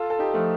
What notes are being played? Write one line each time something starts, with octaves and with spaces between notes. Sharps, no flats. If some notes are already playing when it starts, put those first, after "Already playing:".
Already playing: F4 A4
A4
D#4 G4
F3 A3